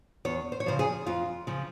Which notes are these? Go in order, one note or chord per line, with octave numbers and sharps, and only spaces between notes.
E2 C#5
C5
C#5
C#3 F3 C5
G#4
F2 F4
C#3 F3